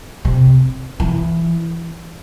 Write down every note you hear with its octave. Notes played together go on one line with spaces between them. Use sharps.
C3
E3